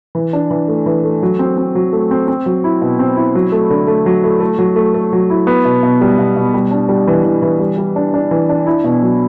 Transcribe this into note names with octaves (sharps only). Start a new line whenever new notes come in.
E3
D4
E3
A3
E3
A3
F#3
C4
C4
F#3
A3
C4
C4
F#3
E4
B2
C4
E4
F#3
A3
D3
A3
F#3
A3
A3
F#3
A3
A3
F#3
E4
B3
B2
B2
G3
B2
B2
G3
D4
G3
E3
E3
E3
G3
G3
D4
D4
E3
D4
E4
B2
F#3